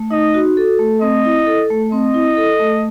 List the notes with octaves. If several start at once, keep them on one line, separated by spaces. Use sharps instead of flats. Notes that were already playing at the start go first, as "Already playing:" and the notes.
Already playing: A3
D#4 D#5
F#4
A4
A3
C4 D#5
E4
A4
A3
C4 D#5
E4
A4
A3